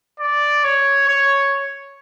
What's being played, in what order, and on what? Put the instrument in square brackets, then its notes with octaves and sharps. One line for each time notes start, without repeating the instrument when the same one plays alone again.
[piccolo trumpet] D5
C#5
C#5